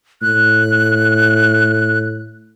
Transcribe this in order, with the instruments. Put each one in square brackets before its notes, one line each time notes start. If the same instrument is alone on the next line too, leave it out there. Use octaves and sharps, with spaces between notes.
[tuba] A2 [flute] F#6